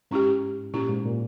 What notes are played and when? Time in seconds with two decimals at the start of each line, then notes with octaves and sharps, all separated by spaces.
0.11 G#2 C#4 E4 G4
0.74 A#2 C#4 E4 G4
0.89 G#2
1.05 A#2